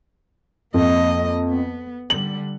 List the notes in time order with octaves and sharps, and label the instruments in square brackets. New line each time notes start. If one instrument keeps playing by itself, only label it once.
[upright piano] F2 [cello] A#3 D#5
[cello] B3
[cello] D3 G3 [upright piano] F#7